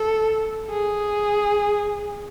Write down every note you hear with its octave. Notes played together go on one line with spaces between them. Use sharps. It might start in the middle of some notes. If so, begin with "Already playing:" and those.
Already playing: A4
G#4